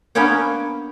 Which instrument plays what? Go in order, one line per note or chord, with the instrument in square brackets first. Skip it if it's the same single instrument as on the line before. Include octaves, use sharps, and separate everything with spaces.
[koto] A#3 B3 C#4 D4 C#5 G5